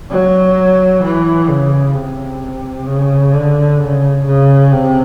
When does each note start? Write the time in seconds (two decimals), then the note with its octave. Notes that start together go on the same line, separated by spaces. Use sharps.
0.11 F#3
1.03 E3
1.49 C#3
1.94 C3
2.87 C#3
3.33 D3
3.78 C#3
4.26 C#3
4.72 C3